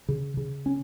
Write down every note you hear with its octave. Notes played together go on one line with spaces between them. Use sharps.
C#3
C#3
C#4